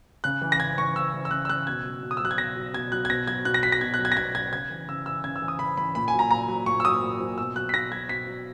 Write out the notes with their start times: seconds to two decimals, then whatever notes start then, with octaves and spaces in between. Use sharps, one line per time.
0.24 C#3 F#6
0.42 E3
0.52 A#6
0.59 C#3 G#6
0.78 E3 C#6
0.96 C#3 E6
1.14 E3
1.25 E6
1.31 C#3 F#6
1.45 E6
1.49 E3 F#6
1.67 B2 G#6
1.85 F#3
2.03 B2
2.11 D#6
2.17 E6
2.20 F#3 F#6
2.31 G#6
2.38 B2 A#6
2.56 F#3
2.74 B2 G#6
2.92 F#3 F#6
3.05 G#6
3.10 B2 A#6
3.27 F#3 G#6
3.45 B2 F#6
3.54 A#6
3.63 F#3 B6
3.72 A#6
3.81 B2 G#6
3.94 F#6
3.99 F#3
4.05 G#6
4.12 A#6
4.17 B2 G#6
4.34 F#3 G#6
4.52 C#3 G#6
4.70 E3
4.88 C#3 E6
5.06 E3 E6
5.24 C#3 G#6
5.36 E6
5.42 E3
5.48 D#6
5.59 C#3 B5
5.77 E3 B5
5.95 A#2 B5
6.08 G#5
6.13 F#3
6.19 A#5
6.31 A#2 A#5
6.48 F#3
6.66 A#2 C#6
6.80 E6
6.85 F#3 D#6
7.03 A#2
7.20 F#3
7.38 B2 E6
7.55 F#3 F#6
7.69 B6
7.74 B2 A#6
7.91 F#3 G#6
8.09 B2 B6
8.27 F#3